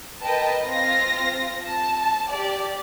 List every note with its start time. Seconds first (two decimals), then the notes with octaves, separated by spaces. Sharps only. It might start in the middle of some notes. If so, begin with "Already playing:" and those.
0.21 A#4 B4 D#5 G5 A5
0.65 C4 F4 F5 A#6
1.65 A5
2.29 G4 D5